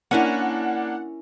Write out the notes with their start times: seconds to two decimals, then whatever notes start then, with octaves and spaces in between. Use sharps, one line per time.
0.11 A#3 C#4 D4 E4 A#4 F#5